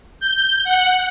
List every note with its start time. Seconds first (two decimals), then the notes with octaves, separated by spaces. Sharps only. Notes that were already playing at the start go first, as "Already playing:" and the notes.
0.20 G6
0.64 F#5